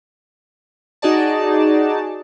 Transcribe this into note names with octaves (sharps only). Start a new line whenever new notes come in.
D#4 F#4 G#4 D5 A5